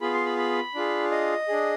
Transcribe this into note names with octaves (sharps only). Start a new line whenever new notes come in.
B3 F4 G#4 B5
C6
B5
B5
D4 F4 G#4
D#5
D4 G#4